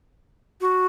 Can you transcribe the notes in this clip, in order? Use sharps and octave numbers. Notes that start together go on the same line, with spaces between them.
F#4